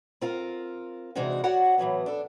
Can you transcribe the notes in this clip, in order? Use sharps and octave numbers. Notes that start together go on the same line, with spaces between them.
C4 F4 A#4
C3 E3 G#3 D4 D#4 F#4
F#4 C#5 D5 F#5
A2 E3 F#3 B3
D4 A4